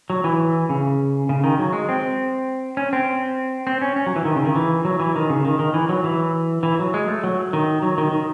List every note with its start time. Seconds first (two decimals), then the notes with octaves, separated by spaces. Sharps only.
0.10 F#3
0.24 E3
0.69 C#3
1.29 C#3
1.44 D#3
1.59 F#3
1.73 G#3
1.89 C4
2.77 C#4
2.93 C4
3.67 C4
3.82 C#4
3.96 C#4
4.06 F#3
4.16 E3
4.25 D#3
4.36 C#3
4.45 D#3
4.56 E3
4.85 F#3
5.00 E3
5.16 D#3
5.30 C#3
5.45 D#3
5.59 D#3
5.74 E3
5.89 F#3
6.04 E3
6.63 E3
6.79 F#3
6.94 G#3
7.08 A3
7.24 F#3
7.53 D#3
7.82 F#3
7.98 D#3
8.12 D#3